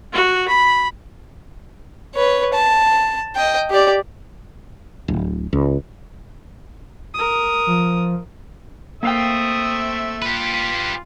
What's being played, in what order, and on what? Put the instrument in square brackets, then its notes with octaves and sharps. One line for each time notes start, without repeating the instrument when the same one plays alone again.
[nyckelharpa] F#4
B5
[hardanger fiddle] B4 C#5
A5
D#5 G5
G4 D5
[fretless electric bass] D1
C#2
[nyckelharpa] A#4 D#6
[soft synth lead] F3
[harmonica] A3 C4 E5 [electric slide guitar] A#3 F5 G5 [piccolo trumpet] D#6
[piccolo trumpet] F4 [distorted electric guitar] G4 B4